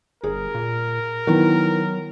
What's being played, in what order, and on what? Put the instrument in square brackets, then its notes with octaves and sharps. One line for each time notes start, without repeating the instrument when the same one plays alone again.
[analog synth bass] G1 [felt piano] G#4 [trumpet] A#4
[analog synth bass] A#2
[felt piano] D#3 E3 B3 [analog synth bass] F#3